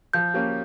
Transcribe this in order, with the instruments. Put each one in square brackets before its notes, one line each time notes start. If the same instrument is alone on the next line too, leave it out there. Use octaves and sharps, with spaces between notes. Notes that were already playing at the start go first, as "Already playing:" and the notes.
[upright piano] F3 [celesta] G6
[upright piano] A#3 C#4 G4